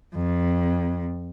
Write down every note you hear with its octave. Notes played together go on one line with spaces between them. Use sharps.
F2